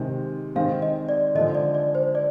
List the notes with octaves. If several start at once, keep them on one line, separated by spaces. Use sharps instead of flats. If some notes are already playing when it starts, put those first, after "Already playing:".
Already playing: C3 D#3 G#3
D#3 G#3 C4 F5
D#5
D5
D3 F3 G#3 D#5
D5
D5
C5
D5